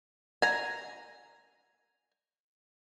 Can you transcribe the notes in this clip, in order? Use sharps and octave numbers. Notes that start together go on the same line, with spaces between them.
G#5 A#5